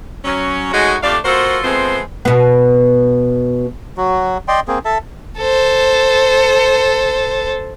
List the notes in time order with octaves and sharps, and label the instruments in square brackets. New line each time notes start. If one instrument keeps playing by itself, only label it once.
[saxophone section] F#3 C#4
G#3 A3 C#4 D#4 F#4
F2 A3 D4 G4 D5 F5
A#3 F4 F#4 A4 C5
F3 G#3 A3 B3 C4
[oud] B2 B3
[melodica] F#3 F#4
D5 D#5 G5 C6
A#3 C4 G#4
A4 E5 A5
[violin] A4 C5